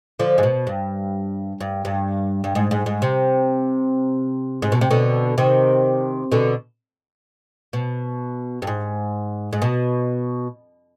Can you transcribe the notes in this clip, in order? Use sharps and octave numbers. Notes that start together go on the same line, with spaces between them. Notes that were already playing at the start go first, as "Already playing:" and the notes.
D3 F3
G#2
B2
G2
G2
G2
G2
G#2
G#2
G#2
C3
G#2
B2
C3
B2 D3
C3 D#3
B2 D3
B2
G2
G#2
G#2
B2